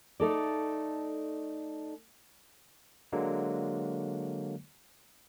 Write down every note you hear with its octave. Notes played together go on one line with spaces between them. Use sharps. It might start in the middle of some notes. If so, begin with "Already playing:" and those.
A3 D#4 A4 D5
D3 F#3 G#3 A#3